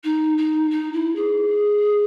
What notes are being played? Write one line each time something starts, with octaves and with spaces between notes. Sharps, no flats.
D#4
D#4
D#4
E4
G#4